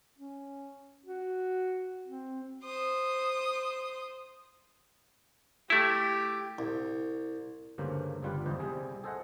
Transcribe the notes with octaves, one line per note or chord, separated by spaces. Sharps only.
C#4
F#4
C4
C5 D#6
A3 E4 G4
C2
D2 G2 C#3 A#3 C5
G1 C#2 G3 F4 B4
G1 E2 D#4 C5
C2 C3 G3 G#4
G#4 A4 C5 D#5 F#5